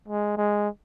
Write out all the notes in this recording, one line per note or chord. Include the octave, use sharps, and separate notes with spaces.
G#3
G#3